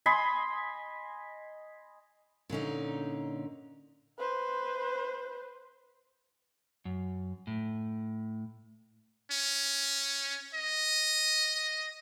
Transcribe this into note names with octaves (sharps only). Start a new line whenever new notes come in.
D#5 G#5 B5 C6
A#2 D3 C#4 D#4
B4 C5
F#2
A2
C#4
D#5